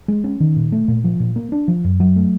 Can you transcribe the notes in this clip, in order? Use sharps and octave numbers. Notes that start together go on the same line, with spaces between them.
G#3
C#4
D#3
A#2
A3
A#2
F3
A#2
A#3
D4
F3
F#2
F#3
A3